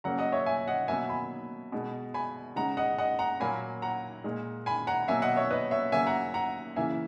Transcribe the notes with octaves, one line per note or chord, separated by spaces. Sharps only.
C#3 F#3 A#3 F#5 A#5
D#5 F#5
C#5 E5
E5 G#5
D#5 F#5
B2 F#3 A#3 E5 G#5
G#5 B5
B2 G#3
G#5 B5
C#3 G#3 F#5 A#5
D#5 F#5
D#5 F#5
F#5 A#5
A#2 F#3 A#3 G#5 B5
F#5 A#5
A#2 G#3
G#5 B5
F#5 A#5
B2 F#3 A#3 E5 G#5
D#5 F#5
C#5 E5
B4 D#5
C#5 E5
C#3 F#3 A#3 E5 G#5
F#5 A#5
F#5 A#5
C#3 E3 A#3 E5 G#5